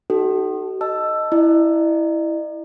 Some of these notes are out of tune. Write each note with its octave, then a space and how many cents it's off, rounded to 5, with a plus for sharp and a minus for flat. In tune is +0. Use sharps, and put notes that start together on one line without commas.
D#4 +0 F#4 +40 A4 -15
D#5 +0 A5 +0 E6 +10
E4 +0 D5 +45